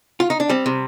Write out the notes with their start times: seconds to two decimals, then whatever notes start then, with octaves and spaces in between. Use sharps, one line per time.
0.20 F4
0.30 D#4
0.40 D4
0.50 G3 C4
0.66 C3